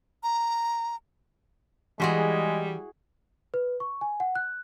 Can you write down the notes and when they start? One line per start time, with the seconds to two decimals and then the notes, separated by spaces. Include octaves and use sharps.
0.23 A#5
2.00 E3 G3 G#3 E4 F#4 G#4 C6
3.54 B4
3.80 C#6
4.01 G#5
4.20 F#5
4.35 F#6